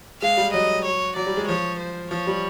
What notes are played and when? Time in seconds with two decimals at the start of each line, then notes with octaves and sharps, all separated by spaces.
0.22 G#3 F5
0.37 G3
0.53 F#3 D#5
0.85 C#5
1.16 F#3 D5
1.27 G3
1.37 G#3
1.48 F3 C#5
1.79 C5
2.11 F3 C#5
2.27 G3